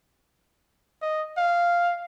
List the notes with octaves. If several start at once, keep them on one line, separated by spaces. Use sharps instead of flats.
D#5
F5